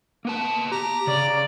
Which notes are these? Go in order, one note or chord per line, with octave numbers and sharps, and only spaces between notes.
A#3 B3 A5
G4 A#5
C#3 D5